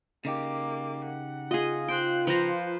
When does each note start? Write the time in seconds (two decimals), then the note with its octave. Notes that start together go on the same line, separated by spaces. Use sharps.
0.25 C#3 A#3 D#4 G4 D6
1.04 F#5
1.51 F4 G#4 D#5
1.88 C5 G5 F#6
2.27 F3 B4 C5 A#5